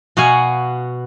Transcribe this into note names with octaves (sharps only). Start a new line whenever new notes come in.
B2 F#4 F5 G#5